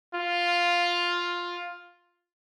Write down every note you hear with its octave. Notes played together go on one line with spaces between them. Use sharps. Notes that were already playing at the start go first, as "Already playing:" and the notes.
F4